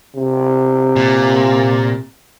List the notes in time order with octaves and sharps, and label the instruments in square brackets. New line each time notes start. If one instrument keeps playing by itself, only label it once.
[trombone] C3
[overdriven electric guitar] A#2